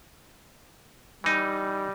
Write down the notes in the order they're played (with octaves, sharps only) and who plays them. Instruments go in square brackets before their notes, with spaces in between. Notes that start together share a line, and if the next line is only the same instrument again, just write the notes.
[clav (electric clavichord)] E3 D#4 [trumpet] G3